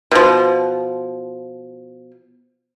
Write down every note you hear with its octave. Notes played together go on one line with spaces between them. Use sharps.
B2 F3